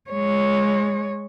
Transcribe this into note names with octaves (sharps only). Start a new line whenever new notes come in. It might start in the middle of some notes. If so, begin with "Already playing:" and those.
G#3 C#5